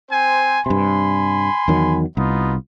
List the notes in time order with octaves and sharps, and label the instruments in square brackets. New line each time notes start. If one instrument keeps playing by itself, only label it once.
[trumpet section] C4 C5 G#5
[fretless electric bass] G2 C3 [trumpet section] G#5 B5 C6
[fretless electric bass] E2 D#3 F#3
[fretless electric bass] C2 [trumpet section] B3 D#4 F4